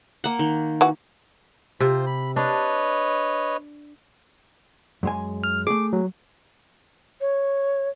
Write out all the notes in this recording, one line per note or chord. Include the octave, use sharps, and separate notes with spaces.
A#3 F#5
D#3
E3 F#4
C3 F4 C5
B5
D4 B4 C#5 D#5
F#2 G#3 G#5
F6
A3 G#4 D6
F#3
C#5